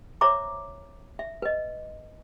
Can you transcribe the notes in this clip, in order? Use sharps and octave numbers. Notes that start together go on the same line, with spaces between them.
C5 C#5 E5 A#5 D6
E5
B4 D#5